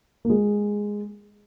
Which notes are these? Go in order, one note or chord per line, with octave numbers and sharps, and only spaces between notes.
A#3
G#3